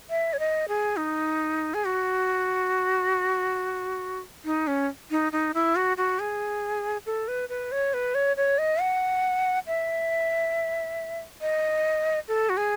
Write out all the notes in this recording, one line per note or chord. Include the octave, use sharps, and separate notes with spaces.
E5
C#5
D#5
G#4
D#4
G#4
F#4
D#4
C#4
D#4
D#4
E4
F#4
F#4
G#4
A4
B4
B4
C#5
B4
C#5
C#5
D#5
F#5
E5
D#5
A4
F#4
G#4